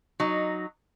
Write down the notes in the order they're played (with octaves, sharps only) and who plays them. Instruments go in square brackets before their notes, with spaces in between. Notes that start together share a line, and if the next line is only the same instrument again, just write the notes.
[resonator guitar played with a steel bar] F#3 D#4